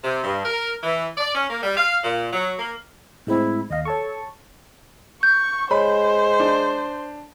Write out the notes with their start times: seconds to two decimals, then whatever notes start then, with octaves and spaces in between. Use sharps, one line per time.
0.04 C3
0.24 G2
0.45 A#4
0.83 E3
1.17 D5
1.35 C#4
1.50 A#3
1.63 G3
1.77 F5
2.03 A#2
2.33 F#3
2.59 A#3
3.27 A2 G#3 C4 E4
3.70 D#2 D#5 F5
3.85 A4 C#5 A5 C#6
5.23 C#6 G6
5.71 G#3 C5 C#5 B5
6.40 D4